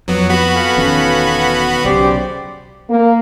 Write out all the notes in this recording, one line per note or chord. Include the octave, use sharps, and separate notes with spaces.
F2 F#3 B3
B3 F#4 B5
A4 F5 G#5
E1 D#3 C#4
B1 C#3 G4 C5 D5
A#3